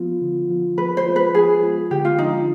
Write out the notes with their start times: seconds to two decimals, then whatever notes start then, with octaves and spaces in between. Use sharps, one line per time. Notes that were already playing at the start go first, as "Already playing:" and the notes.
Already playing: F3 B3 F4
0.21 D3
0.49 F3 B3 F4
0.78 F3 B4
0.97 C5
1.06 G#3 B3 F4
1.16 B4
1.34 F3 G#4
1.62 G#3 B3 F4
1.91 D3 G4
2.05 F4
2.18 F3 G#3 D4 D#4 F4